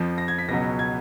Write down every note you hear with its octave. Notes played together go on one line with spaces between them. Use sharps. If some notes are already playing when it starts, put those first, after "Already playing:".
Already playing: F2 F3
A#6
G#6
B6
C#2 B2 F#3 A#6
G#6